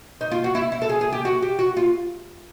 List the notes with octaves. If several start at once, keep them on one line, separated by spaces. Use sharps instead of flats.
D#4
F4
F#4
E4
E4
A4
G#4
G#4
G4
F#4
G4
F#4
F4